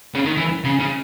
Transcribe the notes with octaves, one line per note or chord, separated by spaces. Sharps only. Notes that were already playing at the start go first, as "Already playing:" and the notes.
C#3
D#3
E3
C#3
C#3